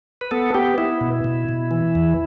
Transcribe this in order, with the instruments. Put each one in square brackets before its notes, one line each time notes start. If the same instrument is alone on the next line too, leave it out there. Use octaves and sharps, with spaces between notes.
[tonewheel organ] B4
B3 A4
B3 G4
B3 E4
B2
B2
B2
E3
E2